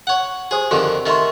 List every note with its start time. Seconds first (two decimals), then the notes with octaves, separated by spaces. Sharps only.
0.07 C#5 F#5
0.51 G4 G#4 C5 D#6
0.71 F2 D3 D#3 G4 G#4
1.06 D#3 A3 D#5 C6